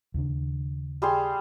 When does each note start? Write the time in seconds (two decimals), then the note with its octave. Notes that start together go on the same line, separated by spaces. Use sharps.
0.14 D#2 C#3 D4
1.02 G3 G#4 C6